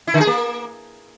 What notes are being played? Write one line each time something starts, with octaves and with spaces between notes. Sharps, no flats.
E4
D3
G#4
A#3